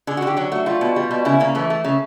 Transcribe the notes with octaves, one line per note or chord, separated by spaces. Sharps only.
D3 G#4
F#4
D3 G4
F#3 F#4
A3 F#4
G3 F4
B2
G3
B2
C#3 E4
C#3 A#3
E3 A3
A3
C#3